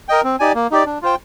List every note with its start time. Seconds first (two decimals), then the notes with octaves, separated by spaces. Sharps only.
0.09 A#4 D#5 G5
0.24 C4
0.40 D#4 G4 D5 G#5
0.55 A#3
0.71 D#4 G4 D5
0.86 D4
1.02 F4 C5 G5